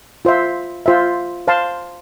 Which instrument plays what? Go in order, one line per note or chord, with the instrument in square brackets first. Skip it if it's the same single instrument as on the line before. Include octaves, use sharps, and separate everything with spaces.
[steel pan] F4 C5 E5
F4 C5 E5
C5 F5 A5 C6